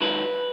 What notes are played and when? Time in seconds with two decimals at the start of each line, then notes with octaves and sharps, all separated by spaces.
0.01 G#2 D#3 F#3 B4